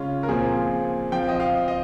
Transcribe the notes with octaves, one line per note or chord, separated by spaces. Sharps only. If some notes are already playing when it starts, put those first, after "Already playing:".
Already playing: C#3 G#3 C#4 F4
A#4
A#2 F3 C4 G#4
F3 C4 G5
D#5
F5
D#5